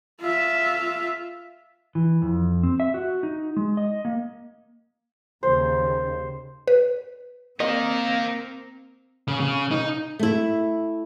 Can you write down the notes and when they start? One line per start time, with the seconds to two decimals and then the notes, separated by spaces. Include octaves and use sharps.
0.21 F4 E5
1.95 E3
2.22 F2
2.63 C4
2.80 E5
2.94 F#4
3.23 D#4
3.57 G#3
3.77 D#5
4.05 A#3
5.43 D#2 C#3 C5
6.68 B4
7.60 A#3 C4 D#4 A#4 D#5
9.28 C#3
9.40 C#3
9.71 D#4
10.19 A3 E4